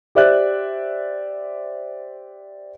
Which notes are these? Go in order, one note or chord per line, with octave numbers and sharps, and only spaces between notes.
G4 C5 D5 E5 F#6